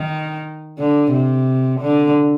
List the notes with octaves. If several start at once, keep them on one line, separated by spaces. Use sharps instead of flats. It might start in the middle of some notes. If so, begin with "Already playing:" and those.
Already playing: D#3
D3
C3
D3